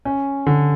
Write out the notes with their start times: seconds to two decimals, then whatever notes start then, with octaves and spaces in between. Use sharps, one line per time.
0.05 C#4
0.46 D3